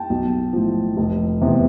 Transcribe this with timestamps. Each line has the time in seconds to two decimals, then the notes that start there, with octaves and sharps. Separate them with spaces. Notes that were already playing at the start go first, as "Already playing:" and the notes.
Already playing: G5 A5
0.10 B1
0.53 A2 F3
0.97 F1
1.41 E2 C3